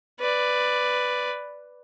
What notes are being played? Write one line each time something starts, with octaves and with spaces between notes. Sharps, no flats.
B4 D5